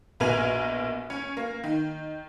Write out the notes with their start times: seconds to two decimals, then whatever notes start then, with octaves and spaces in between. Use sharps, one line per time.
0.20 A#1 B2 A#4 G#5 F7
1.10 C#4
1.37 A#3
1.64 D#3